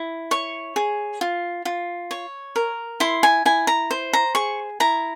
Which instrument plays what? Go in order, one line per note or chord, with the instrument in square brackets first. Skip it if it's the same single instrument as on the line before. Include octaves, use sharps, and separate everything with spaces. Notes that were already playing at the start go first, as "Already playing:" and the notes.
Already playing: [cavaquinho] E4
C#5 C#6
G#4
F4
F4
C#5
A#4
E4 C6
G#5
E4 G#5
A#5
C5
A#5
G#4 C#6
E4 A#5